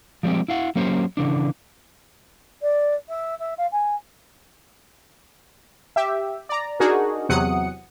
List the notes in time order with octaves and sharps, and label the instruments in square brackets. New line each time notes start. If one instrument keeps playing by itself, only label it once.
[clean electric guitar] F3 G3 G#3 C4 G4
E4 F5 F#5
F#3 A#3 C#4 G4 C5
C#3 E3 D4
[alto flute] D5
E5
E5
F5
G#5
[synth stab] G4 E5
D5 A#5
D4 D#4 F#4 G#4 A#4
E2 C3 F#3 F#5 D#6 C#7